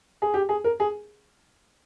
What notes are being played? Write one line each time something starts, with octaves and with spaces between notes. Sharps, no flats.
G#4
G4
G#4
A#4
G#4